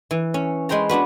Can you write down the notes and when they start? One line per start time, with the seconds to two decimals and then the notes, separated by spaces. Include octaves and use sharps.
0.11 E3
0.34 C#4
0.69 G#3 B4 C5 G5 A#5
0.89 B3 D4 F#4 B4